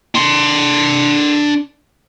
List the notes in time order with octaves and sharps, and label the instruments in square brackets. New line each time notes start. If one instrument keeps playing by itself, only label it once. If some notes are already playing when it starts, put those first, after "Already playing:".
[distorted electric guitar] D4 C6